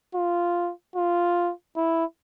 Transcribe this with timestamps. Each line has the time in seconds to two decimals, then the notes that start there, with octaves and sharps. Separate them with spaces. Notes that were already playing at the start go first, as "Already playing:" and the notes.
0.15 F4
0.96 F4
1.76 E4